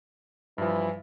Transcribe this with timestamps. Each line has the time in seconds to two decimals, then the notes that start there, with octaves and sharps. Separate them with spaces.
0.58 G2 E3 F3